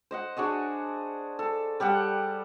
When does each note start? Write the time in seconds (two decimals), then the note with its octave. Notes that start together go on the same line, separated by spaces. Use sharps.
0.11 C5 D#5 F#5
0.37 D4 F#4 G#4 D#5
1.39 A4
1.80 G3 G4 A4 F#5